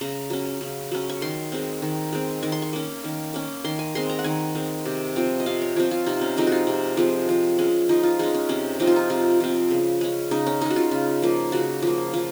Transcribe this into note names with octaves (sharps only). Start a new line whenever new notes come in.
C#3 A#5
F#3 C#4
C#3
F#3 C#4
C#6
D#3 C6
G#3 C4
D#3
G#3 C4
D#3 C#6
C6
C#6
A#3 C#4
D#3
A#3 C#4
D#3 C6
G#5
G#3 C4 C6
A#5
F#5
D#3 G#5
G#3 C4
C3
F3 C4
D#5
C3 F5
C#5
F3 C4 C#5
F4
C3 D#4
C#4
F3 G#3 C4 D#4
F4 F#4
C3
F3 G#3 C4
F3
G#3 C#4
F3 D#4
F4
G#3 C#4 D#4
C#4
C3 C#4
F3 C4 D#4
F4
D#4
C3 F4
F3 C4
C#3
G#3 C#4
C#3 D#4
C#4
G#3 C#4 D#4
F#4
F4
C#3
F3 A#3
C#3 F#4
F3 A#3
F3